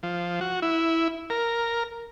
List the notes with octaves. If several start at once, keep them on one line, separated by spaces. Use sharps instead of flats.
F3
F#4
E4
A#4